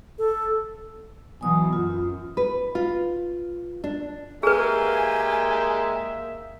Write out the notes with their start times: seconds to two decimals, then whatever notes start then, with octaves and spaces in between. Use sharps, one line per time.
0.19 A4
1.41 B2 E3 F#3 G#5 D#6
1.73 F#2 F4
2.37 B4
2.75 F4
3.84 D4
4.43 G#3 A#3 G4 G#4 A#4 B4 E5 G#5